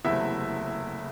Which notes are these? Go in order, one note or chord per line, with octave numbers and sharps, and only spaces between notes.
F#1 E2 C3 F#3 A3 E4 E5